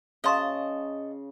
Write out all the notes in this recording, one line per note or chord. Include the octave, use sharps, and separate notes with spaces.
C#3 C5 D#5 A5 C6 C#6